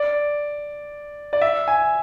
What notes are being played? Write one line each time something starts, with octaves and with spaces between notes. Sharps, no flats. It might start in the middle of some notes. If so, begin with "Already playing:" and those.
Already playing: D5
D5
E5
G#5